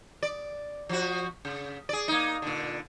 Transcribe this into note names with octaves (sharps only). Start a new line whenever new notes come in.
D5
F3 F#4
C#3
G#4 D5
A#3 D#4
A#2 D3